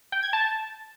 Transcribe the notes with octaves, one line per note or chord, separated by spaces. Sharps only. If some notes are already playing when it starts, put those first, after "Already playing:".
G5
G#6
A5